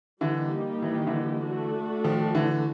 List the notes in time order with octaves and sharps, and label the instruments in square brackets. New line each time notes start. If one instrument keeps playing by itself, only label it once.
[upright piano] D3 E3 [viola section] G3 A#3 D#4 G4
[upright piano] E3
D#3
D3 E3
[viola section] A3 D4 F#4
[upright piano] D#3 F3
D3 E3